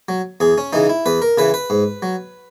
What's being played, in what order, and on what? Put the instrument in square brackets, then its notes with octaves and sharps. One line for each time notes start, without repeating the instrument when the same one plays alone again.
[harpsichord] F#3
E2 G#4
C#4
C#3 E3 D#4
E4
E2 B4
A#4
C#3 E3 B4
B4
G#2
F#3